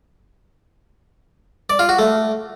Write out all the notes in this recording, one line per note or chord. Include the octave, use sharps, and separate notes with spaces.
D5
F4
F#4
A3